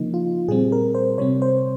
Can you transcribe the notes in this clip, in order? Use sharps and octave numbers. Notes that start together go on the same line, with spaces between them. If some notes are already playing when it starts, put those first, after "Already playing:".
Already playing: C#3 F3 A#3 D#4
F4
A#2 G3 C4 G#4
A#4
C5
C3 G3 C4 C#5
C5